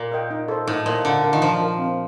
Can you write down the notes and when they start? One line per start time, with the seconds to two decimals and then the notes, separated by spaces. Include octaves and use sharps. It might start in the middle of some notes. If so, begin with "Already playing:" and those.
Already playing: A#2
0.12 A#4 D#5 G5
0.31 D#4
0.48 A4 C5 D#5
0.67 A2 D#4
0.86 A#2 A4 C5 D#5
1.04 D3 D4
1.23 F4 A#4 F5
1.33 D#3
1.42 F3 D4
1.60 F4 A#4 F5
1.79 C4